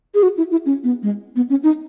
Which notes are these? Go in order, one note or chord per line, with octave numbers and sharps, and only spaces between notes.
G#4
F#4
E4
E4
C#4
B3
G#3
B3
C#4
D#4